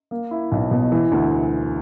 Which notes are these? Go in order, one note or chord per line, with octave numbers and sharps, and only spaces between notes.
A#3
E4
B1
B2
E3
D2